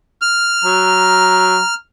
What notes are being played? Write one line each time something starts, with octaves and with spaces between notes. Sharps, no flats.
F6
F#3 A#5